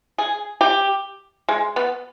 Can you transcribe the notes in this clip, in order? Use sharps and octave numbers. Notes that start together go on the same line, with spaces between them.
G#4
G4
G#3
B3